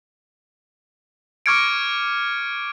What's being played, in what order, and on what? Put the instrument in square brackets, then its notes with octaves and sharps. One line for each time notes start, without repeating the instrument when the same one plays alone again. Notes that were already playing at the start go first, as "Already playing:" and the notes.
[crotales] C#6 D6 F6 G#6 C#7 D7